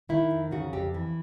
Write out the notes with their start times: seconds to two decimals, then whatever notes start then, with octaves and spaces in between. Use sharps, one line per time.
0.09 D#3 E4
0.31 F2
0.51 C#3 F#4
0.73 F2 G4
0.94 E3